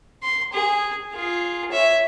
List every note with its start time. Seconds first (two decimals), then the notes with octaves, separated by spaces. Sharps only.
0.23 C6
0.53 G#4
1.13 F4 G#4
1.72 C#5 E5